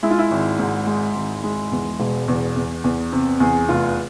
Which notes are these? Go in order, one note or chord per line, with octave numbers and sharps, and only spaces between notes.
G#3 E4
F4
E4
G#1
G#2
G#3
G#1
G#3
E2
E1
E2
E2
E2
C3
E2 G#4
F1 F4